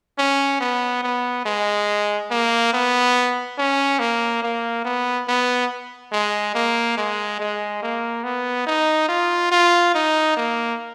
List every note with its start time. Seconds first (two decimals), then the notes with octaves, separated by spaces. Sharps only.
0.19 C#4
0.60 B3
1.03 B3
1.45 G#3
2.31 A#3
2.73 B3
3.58 C#4
4.00 A#3
4.43 A#3
4.85 B3
5.28 B3
6.12 G#3
6.55 A#3
6.98 G#3
7.40 G#3
7.82 A#3
8.24 B3
8.67 D#4
9.09 F4
9.52 F4
9.94 D#4
10.37 A#3